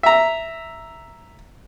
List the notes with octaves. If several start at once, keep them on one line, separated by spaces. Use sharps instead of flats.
E5 A#5